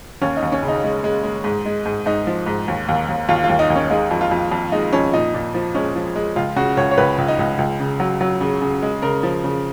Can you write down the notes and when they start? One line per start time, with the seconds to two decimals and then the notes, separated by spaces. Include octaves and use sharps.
0.22 D#2 C#4
0.37 D#4
0.42 D#2
0.52 C#4
0.63 C#3
0.68 D#4
0.83 G#3
1.04 G#3
1.24 G#3
1.44 G#2
1.66 G#3
1.86 G#2
2.06 G#2 D#4
2.27 F3
2.46 G#2
2.68 D#2
2.89 D#2
3.09 D#2
3.29 D#2 F4
3.44 F4
3.49 D#2
3.59 D#4
3.70 D#2
3.76 C#4
3.90 G#3 D#4
4.11 F2
4.21 F4
4.31 F2
4.51 F2
4.72 G#3 D#4
4.93 F2 C#4
5.13 A#2 D#4
5.34 A#2
5.54 F3
5.75 G#3 C#4
5.96 F3
6.16 G#3
6.36 C#2 F4
6.56 C#3 F#4
6.77 C#2 C#5
6.91 C#5
6.98 C#2 B4
7.18 C#2
7.28 D#4
7.39 C#2
7.59 C#2
7.80 C#3
8.00 F#3
8.21 F#3
8.41 C#3
8.62 C#3
8.83 G#3
9.02 C#3 A#4
9.23 F3
9.44 C#3